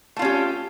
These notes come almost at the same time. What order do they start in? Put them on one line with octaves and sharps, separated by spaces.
A3 F4 C#4 G4